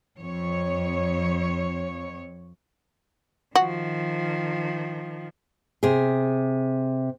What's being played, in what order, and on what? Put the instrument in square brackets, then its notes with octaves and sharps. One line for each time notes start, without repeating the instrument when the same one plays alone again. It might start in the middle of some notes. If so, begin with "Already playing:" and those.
[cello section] F2 C#5
[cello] D#3 F3 [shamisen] F#4
[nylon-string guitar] C3 G#4